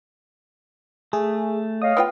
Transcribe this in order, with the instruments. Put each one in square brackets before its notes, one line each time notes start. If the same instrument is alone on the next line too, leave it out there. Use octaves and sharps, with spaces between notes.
[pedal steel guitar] A3 [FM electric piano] G#4
[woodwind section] C#5 D#5 F5 [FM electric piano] D#6
[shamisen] B3 F4 G5